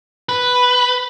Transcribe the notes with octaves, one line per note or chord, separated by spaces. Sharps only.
B4